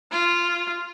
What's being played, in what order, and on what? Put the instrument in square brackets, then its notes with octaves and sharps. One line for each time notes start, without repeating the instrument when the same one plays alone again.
[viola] F4